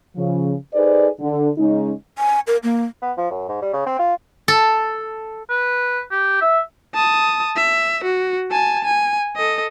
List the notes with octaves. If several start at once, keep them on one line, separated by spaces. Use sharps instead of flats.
C#3 F3
D#4 G#4 A4 B4 C5 D5
D3
C#3 G#3 C#4 D#4
G#5
A#4
A#3
B3
F3
F#2
G#2
G3
C#3
C4
F4
A4
B4
G4
E5
A5 D#6
E5
F#4
G#5 A5
G#5
A4 D#5